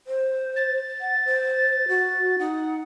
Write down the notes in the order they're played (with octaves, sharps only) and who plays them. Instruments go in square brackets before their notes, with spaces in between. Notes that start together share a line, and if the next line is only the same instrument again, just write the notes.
[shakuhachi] C5
[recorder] A6
[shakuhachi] F#5
C5
F#4
[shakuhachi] D#4 [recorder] F#5